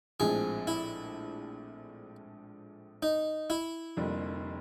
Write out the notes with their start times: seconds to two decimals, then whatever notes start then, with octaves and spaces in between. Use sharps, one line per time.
0.20 A#1 A2 F3 G#3 C4 G#4
0.67 E4
3.02 D#4
3.50 E4
3.97 F1 F2 D3 G3 A#3